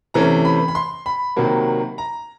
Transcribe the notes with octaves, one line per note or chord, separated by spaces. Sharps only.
C3 E3 A3 C#4 A#5
B5
B5
C6
B5
C3 D#3 F#3 A#3
A#5